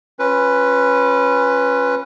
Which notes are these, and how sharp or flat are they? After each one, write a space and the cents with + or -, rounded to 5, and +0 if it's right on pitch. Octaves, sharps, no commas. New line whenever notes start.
C#4 -10 F4 +10 B4 +0